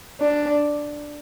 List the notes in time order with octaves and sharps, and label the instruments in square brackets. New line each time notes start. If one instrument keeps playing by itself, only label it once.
[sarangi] D4